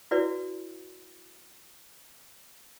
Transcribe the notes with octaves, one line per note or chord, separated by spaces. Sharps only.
E4 F#4 B4 D5